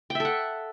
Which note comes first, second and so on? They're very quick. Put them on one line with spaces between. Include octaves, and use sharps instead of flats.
G5 E5 A4 F#5